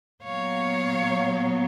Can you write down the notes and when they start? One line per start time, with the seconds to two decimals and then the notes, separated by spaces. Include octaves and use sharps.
0.23 A#2 F#3 B3 C#5 F5